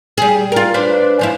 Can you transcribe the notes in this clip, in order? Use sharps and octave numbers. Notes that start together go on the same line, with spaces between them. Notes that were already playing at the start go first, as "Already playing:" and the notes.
G3 G#4
F4 A#4
D4 B4 C5
F#2 F3 E4